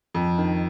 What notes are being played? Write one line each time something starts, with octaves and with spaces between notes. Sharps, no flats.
F2
D#3